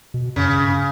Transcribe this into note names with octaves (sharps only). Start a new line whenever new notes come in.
B2
F#2 C#3
G2
G2